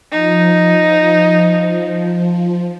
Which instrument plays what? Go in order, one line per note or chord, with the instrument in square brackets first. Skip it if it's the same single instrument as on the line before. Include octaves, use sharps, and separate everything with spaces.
[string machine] F3 [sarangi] D#4